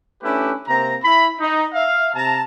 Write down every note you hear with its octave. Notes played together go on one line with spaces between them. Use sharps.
A3 C#4 D4 E4 G4 B4
C3 A#3 C4 A#5
E4 B5
D#4
E5 F5
C3 A5 A#5